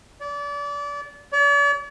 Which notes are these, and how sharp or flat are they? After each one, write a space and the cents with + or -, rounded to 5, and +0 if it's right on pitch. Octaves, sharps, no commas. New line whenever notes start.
D5 -30
D5 -45